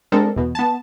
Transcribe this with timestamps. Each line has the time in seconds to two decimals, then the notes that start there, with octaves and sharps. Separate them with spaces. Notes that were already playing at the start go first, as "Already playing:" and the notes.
0.12 G#3 C4 D4 A4 A#4
0.36 E2 B2
0.55 B3 A5